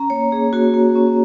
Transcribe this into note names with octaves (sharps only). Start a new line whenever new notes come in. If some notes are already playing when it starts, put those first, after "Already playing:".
Already playing: C#4 A#5
A#3 C#5
A#3 G#4
A#3 F#4
A#3
C#4